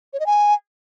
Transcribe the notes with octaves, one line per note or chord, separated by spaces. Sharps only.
C#5
D#5
G#5